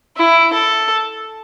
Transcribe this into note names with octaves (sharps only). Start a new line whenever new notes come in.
E4
A4